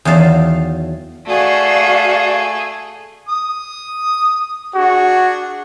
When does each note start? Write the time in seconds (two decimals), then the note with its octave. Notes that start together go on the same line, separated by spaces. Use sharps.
0.05 E2 D#3 F#3 F5 A5
1.26 A3 F#4 G#4 D5 F5
3.29 D#6
4.75 D4 F#4 G#4